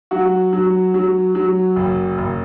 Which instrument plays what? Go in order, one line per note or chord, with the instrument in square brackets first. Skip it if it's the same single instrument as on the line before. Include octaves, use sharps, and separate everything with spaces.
[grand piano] F#3 F#4
F#3
F#3
F#3
F#1
F#1